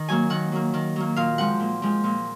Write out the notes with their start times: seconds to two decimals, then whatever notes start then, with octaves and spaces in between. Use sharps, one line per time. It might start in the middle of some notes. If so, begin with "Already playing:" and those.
Already playing: D#3
0.08 F#3 A#3 G#5
0.30 D#3 F#5
0.52 F#3 A#3
0.74 D#3
0.96 F#3 A#3
1.16 A#2 F5
1.38 F3 G#3 C4 F#5
1.60 A#2
1.82 F3 G#3 C4
2.04 A#2